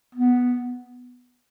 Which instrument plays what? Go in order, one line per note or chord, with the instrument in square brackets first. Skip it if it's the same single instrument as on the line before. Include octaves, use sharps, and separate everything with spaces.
[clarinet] B3